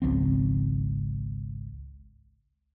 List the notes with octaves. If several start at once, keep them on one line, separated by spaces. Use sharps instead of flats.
G#1 C#2 F3 C4